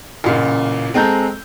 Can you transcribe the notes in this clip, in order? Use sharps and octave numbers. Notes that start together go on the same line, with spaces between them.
A1 A#2 C#3
G#3 C4 A4 A#5 G6